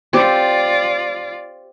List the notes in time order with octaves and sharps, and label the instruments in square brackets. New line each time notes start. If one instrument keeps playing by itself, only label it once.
[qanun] C4 G4 [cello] F4 D5